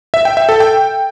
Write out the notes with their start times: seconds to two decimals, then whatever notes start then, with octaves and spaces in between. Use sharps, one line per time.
0.14 E5
0.25 G5
0.37 E5
0.49 A4
0.60 G5